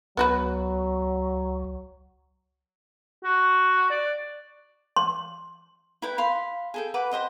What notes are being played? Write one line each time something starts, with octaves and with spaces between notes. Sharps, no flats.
C#2 F#3 B3 F#4 B4
F#4
D5
C6
E4 B4 G5
F5 B5 C6
G#4 A4 G5
B4 F#5 B5 D6
G4 C5 D#5 F#5